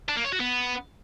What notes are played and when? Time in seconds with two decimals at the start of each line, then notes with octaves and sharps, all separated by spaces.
0.09 D4
0.17 A#3
0.24 C#5
0.32 F#4
0.40 B3